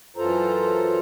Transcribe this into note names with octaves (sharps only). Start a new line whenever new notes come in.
F#2 E3 F4 A4 C5 A#5